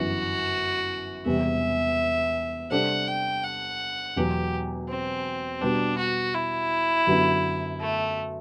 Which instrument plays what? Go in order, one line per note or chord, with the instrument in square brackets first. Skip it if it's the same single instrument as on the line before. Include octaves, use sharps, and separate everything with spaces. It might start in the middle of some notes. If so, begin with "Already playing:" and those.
Already playing: [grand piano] G1 F#2 E3 [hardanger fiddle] F#4
[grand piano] E1 E2 C3 G3 [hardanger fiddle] E5
[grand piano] C3 G3 D4 A4 C5 [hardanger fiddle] F#5
[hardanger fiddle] G5
F#5
[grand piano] E1 E2 B2 F#3 [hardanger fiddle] G4
[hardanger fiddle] C4
[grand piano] B2 G3 B3 [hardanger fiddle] D4
[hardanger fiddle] F#4
E4
[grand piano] F#2 D3 F#3 B3
[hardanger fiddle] A3